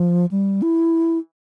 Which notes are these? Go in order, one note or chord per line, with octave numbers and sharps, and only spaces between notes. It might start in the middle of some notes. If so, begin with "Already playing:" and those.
Already playing: F3
G3
E4